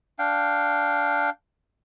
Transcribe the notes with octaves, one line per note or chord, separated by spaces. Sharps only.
D4 F5 G5